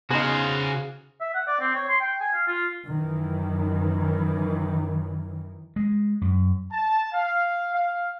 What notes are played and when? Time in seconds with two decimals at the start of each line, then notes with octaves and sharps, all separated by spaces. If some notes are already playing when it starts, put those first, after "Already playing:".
0.11 C#3 B3 D#4 F#4 G#4 C5 F5 G#5
1.21 E5
1.34 F#5
1.47 D5
1.60 C4
1.75 C#5
1.89 C6
2.00 G5
2.21 G#5
2.34 F5
2.47 F4
2.87 F#2 D#3 E3
5.76 G#3
6.21 F#2
6.72 A5
7.12 F5
7.75 F5